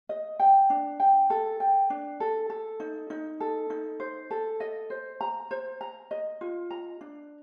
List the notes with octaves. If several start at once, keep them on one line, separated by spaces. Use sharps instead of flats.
D#5
G5
D4
G5
A4
G5
D4
A4
A4
D#4
D#4
A4
D#4
C5
A4
D#5
C5
A#5
C5
A#5
D#5
F4
A#5
D4